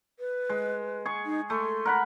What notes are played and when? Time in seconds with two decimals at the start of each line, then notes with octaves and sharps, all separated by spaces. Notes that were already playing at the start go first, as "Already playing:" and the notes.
0.19 B4
0.49 G#3
1.05 G#4 C#6
1.26 D#4
1.50 A3 C6
1.85 A#4 F#5 B5